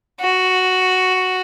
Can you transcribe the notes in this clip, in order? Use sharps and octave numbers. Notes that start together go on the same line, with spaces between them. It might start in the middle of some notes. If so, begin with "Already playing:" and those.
F#4